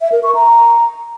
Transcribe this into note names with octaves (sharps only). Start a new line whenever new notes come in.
E5
A#4
C#6
A#5